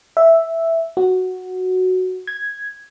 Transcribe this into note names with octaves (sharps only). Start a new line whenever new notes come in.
E5
F#4
G#6